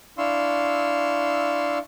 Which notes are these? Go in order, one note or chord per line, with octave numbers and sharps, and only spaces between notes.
D4 E4 F5 C6 C#6 E6